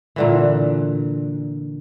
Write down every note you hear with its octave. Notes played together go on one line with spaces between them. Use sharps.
A#2 D3 E3